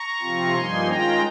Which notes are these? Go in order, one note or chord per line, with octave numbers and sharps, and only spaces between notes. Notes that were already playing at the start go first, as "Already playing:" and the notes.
Already playing: A#5 C#6
C3 F3 C4 F4
G2 F3 A#3 D#4 G#5 C6
D#3 G#3 C#4 F4 G5 A#5